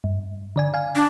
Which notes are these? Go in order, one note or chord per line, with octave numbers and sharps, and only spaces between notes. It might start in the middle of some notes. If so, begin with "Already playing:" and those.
G2
D3 D5 G#5
F5 G#5
D4